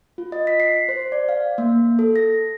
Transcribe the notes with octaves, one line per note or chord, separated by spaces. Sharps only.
F4
D#5
B6
C7
C5
D5
F5
A#3
A4
A#6